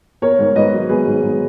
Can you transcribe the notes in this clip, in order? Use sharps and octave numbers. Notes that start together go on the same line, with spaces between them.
B3 A#4 C#5
G#2
G#2 B4 D#5
F#3
B3 G#4 B4
G#2
G#2